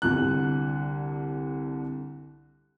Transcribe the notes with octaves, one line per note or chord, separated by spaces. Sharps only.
C2 D3 F#6